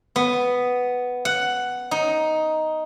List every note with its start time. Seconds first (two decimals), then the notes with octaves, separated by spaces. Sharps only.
0.16 B3
1.25 F#5
1.91 D#4